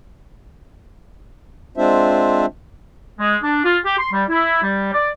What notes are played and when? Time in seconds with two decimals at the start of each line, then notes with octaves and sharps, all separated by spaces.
1.77 G#3 C4 D4 F4 C5 E5
3.18 G#3
3.43 D4
3.64 F4
3.85 G4
3.99 C6
4.12 G3
4.29 E4
4.62 G3
4.94 D5